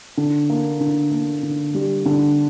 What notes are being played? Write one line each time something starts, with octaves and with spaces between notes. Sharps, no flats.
D3
A#3
D3
A#3
D3
G3
D3